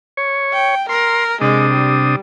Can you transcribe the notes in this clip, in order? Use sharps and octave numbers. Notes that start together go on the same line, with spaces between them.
C#5
G5
A#4 C6
C3 G#3 D4 D#6
G3